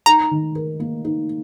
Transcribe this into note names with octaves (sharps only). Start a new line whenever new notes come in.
D#4 A#5
D#3
A#4
A#3
D#4